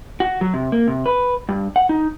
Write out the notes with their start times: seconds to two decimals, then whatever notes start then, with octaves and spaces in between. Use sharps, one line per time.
0.20 F#4
0.41 F#3
0.54 C3
0.72 A#3
0.88 C3
1.06 B4
1.49 G2
1.76 F#5
1.89 D#4